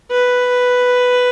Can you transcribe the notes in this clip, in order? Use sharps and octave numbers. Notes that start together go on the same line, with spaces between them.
B4